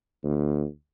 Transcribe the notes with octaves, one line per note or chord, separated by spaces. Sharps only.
D2